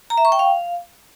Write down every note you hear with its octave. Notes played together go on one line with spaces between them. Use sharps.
A#5
E5
C#6
G5
F5